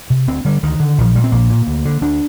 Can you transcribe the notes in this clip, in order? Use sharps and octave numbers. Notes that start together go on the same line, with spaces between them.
C3
D2 C4
D3 G3
D2 D#3
D3
A#1 D#3
F3
A#2 G3
C4
A#1 A#3
A#2
D2
D3
D2 D4